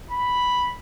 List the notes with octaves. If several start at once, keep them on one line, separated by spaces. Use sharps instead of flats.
B5